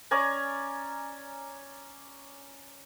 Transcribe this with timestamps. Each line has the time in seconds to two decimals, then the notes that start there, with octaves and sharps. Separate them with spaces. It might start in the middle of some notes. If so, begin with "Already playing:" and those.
0.11 C#4 D5 G#5 A#5